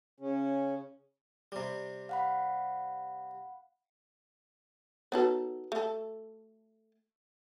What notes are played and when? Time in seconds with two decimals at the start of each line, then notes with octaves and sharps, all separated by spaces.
0.20 C#3 C#4
1.52 C3 G3
2.09 F5 F#5 B5
5.12 B3 D#4 F#4 A4 B4 C#5
5.72 A3 A4